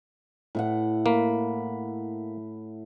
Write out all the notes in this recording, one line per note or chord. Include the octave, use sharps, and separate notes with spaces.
A2 E4 F#5
A#3 B5